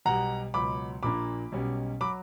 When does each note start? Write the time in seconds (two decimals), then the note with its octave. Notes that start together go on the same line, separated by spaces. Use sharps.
0.05 B1 B2 G3 F#5 A#5
0.54 C#2 B2 F#3 B5 D6
1.03 A#1 A#2 A#3 D4 B5 D6
1.52 B1 B2 G3 C#4
2.01 F#3 B5 D6